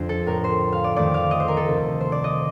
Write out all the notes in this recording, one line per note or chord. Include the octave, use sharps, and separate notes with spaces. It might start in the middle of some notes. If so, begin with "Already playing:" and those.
Already playing: F2 D3 C5
A4
A2 A3 A#4
C5
F5
D5
F2 D#3 A3 D5
F5
D#5
C5
A#4
A4
D2 C3 D#3 A3
C5
D5
D#5